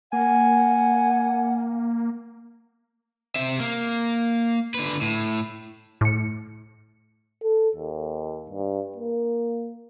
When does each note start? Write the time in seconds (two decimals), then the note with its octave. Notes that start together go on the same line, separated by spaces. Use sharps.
0.13 A#3 F#5 G#5
3.36 C3 E5
3.60 A#3
4.74 D3 B4
5.02 A2
6.01 A2 C#7
7.43 A4
7.76 D#2
8.49 G2
8.96 A#3